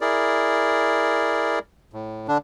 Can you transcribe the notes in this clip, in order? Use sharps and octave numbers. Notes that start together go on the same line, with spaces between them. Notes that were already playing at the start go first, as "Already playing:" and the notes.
E4 G#4 A#4 D5
A2
D3 D4